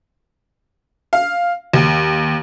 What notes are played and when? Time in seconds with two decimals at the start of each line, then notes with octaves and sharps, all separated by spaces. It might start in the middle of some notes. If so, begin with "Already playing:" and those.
1.13 F5
1.73 D#2